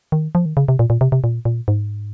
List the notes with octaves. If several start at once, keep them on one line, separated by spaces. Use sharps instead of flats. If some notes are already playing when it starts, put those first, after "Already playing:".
D#3
F3
D#3
C#3
C3
A#2
A#2
C3
C3
A#2
A#2
G#2